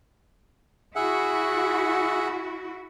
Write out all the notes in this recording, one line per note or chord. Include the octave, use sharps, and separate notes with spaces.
E4 F#4 G#4 E5 F#5